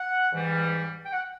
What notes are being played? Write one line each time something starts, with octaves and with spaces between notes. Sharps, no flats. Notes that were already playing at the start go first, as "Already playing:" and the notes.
Already playing: F#5
G#2 E3 G3
G5
F#5